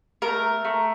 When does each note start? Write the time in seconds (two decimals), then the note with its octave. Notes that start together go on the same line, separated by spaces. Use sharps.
0.22 A3 A#4
0.65 A3